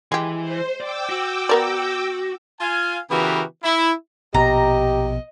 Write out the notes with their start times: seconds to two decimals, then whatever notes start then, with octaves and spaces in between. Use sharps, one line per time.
0.12 E3 G#3 G4
0.41 C5
0.80 D5 G5 D6 E6
1.09 F#4
1.49 B3 A#4 D5
2.60 F4 F5 G#5
3.09 C#3 E3 B3 F#4 G4 A#4
3.63 E4
4.35 A#1 B2 G4 D#5 A#5